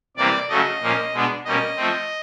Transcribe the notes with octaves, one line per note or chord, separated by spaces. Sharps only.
C3 E3 G3 A#3 D5
C#3 F#3 A3 D#5
A#2 F3 A#3 C#4
B2 G#3 B3 D4
B2 G3 A#3 C#4 D#5
F3 A3 C4